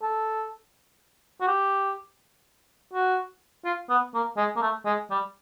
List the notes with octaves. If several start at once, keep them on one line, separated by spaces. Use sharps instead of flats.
A4
F#4
G4
F#4
F4
B3
A#3
G#3
A#3
A3
G#3
G3